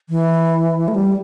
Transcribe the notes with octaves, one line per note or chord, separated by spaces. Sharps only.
E3
A3
G3